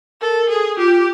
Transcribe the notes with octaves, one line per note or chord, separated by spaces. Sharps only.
A4 A#4
G#4 A4
F4 G4